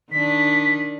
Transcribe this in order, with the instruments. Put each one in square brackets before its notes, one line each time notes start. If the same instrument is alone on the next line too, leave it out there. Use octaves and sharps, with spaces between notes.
[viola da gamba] D#3 D4 [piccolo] B6